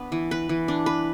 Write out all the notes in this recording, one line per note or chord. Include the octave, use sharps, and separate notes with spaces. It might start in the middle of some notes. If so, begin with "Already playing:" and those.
Already playing: B3 D4 B4
E3
B4
E3
D4
B4